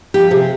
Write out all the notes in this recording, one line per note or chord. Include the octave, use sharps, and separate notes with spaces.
F3 G4
C3 G#4